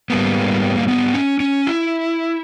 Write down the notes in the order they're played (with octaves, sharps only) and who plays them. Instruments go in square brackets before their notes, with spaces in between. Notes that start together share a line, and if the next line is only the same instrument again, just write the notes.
[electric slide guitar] G#2 G3 A#3 B3
A#3
B3
C#4
C#4
E4